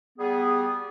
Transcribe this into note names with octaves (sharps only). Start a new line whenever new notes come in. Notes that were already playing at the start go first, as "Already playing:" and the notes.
G3 B3 G#4